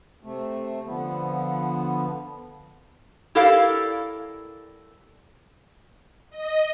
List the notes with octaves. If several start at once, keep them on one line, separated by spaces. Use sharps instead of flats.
C3 A3
D3 F3 B3
E4 G4 A4 A#4 D5 F5
D#5